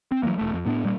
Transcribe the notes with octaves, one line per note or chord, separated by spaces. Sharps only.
C4
E3 F#3 G#3 A#3
E1 A3
F2
A2 B3 D4
A#2 G3 A3 A#3